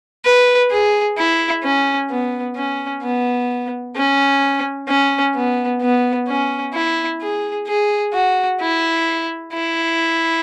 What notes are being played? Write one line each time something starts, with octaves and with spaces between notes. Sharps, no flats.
B4
G#4
E4
C#4
B3
C#4
B3
C#4
C#4
B3
B3
C#4
E4
G#4
G#4
F#4
E4
E4